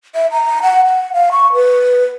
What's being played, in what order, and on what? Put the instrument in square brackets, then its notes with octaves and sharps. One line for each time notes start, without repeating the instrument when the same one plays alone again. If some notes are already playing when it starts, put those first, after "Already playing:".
[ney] E5
A#5
F#5
F#5
F5
C#6
B4